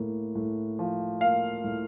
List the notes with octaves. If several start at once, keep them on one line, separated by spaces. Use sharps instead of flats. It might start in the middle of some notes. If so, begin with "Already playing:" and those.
Already playing: A2 A#3
A2
F3
A#3 F5
A2